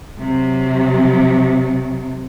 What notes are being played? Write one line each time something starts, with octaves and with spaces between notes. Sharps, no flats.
C3 F#3